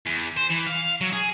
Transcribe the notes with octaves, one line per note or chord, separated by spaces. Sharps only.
E2
C5
E3
F5
F#3
G#4